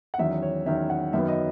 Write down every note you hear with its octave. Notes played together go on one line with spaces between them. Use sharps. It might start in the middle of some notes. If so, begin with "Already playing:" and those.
F#5
E2 D#3 F#3 C#4 E5
C#5
E2 D#3 F#3 C#4 E5
F#5
F#2 D#3 F#3 B3 E5
D#5